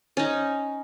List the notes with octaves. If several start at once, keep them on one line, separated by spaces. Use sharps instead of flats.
C#4 D#4